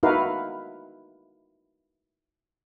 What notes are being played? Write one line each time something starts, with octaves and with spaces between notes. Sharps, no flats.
D#4 E4 F#4 A#4 B4 F5